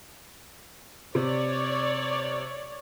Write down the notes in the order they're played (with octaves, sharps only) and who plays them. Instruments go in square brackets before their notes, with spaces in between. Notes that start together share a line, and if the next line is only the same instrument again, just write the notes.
[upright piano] C3 [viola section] C#5 D5